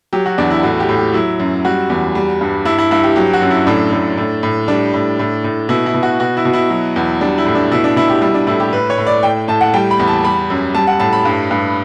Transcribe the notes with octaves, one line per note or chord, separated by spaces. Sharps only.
F#3 G4
F#4
E2 D4
E4
A2 F#4
G4
A2
G4
F#3 E4
F#2
G3 F#4
E2
G3
G2
G2 E4
E4
G2 E4
G4
F#3 G4
F#4
F#2
E4
A2 D4
A2
A2
A2
G3 D4
A2
A2
A2
B2 E4
E4
B2
F#4
B2 F#4
E4
B2
E4
F#3
E2
G3 D4
E4
A2
D4
B2 E4
D4
B2 E4
G4
G3 E4
D4
A2 E4
G4
A2 B4
C#5
A2
D5
A2 G5
A2 A5
F#5
G3 G5
B5
E2
A5
G3 B5
F#2
G3 A5
F#5
A2 A5
B5
G2
G2